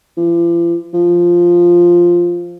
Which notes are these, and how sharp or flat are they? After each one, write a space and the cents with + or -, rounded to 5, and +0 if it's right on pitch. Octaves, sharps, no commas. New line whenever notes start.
F3 -45
F3 +0